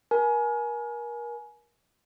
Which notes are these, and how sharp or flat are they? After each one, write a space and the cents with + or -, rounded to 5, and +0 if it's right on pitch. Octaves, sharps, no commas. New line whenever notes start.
A#4 +30 G#5 +25